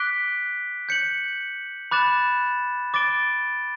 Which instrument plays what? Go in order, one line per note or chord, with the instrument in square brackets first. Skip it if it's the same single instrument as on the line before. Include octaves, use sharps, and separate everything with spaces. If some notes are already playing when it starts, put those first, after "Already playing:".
Already playing: [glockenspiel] D6 F#6 B6 D7 G7
G6 C#7 F#7
B5 D6 F#6 A6 E7
D6 A6 D7 G7